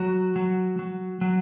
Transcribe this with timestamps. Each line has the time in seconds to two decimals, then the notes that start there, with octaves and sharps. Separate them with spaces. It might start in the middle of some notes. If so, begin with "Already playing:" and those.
Already playing: F#3 F#4
0.36 F#3
0.79 F#3
1.21 F#3